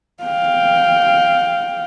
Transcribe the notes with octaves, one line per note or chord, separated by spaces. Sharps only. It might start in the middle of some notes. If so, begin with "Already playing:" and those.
F5 G5